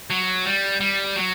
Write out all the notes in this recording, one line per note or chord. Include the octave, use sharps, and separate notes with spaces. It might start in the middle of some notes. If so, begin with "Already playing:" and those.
F#3
G3
G3
F#3